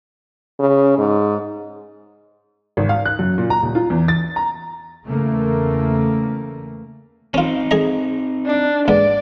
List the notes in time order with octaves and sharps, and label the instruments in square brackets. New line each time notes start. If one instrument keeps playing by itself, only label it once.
[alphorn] C#3
G#2
[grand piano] G#1
F5
F#6
F#2
A#2
A#5
D#1
F4
E2
A6
A#5
[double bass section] E2 C#3 A3 A#3
[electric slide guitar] C4 D#4 [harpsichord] C#4 F4
[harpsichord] G#4 D#5 A#5
[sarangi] D4
[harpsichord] G#2 B3 [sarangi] D5